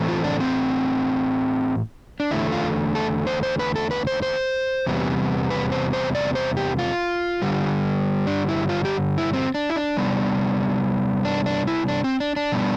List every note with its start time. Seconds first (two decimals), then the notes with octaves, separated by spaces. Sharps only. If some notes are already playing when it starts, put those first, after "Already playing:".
Already playing: A2 E3 A3 C4
0.08 F4
0.24 D4
0.40 C4
2.20 D4
2.31 E2 D3 A3 E4
2.52 F4
2.95 A4
3.27 C5
3.43 C5
3.59 B4
3.76 A4
3.91 B4
4.07 C5
4.22 C5
4.86 E2 C3 G3 B3
5.50 B4
5.72 C5
5.93 C5
6.15 D5
6.35 C5
6.57 G4
6.79 F4
7.42 G2 D3 G3
8.27 D4
8.48 E4
8.69 F4
8.85 G4
9.18 E4
9.33 C4
9.55 D4
9.70 E4
9.76 D4
9.97 C3 G3 B3
11.25 D4
11.46 D4
11.67 E4
11.88 D4
12.04 C4
12.20 D4
12.36 D4
12.52 B2 G3 B3